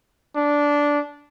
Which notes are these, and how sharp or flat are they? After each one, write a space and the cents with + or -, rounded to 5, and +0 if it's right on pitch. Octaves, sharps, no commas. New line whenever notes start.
D4 -10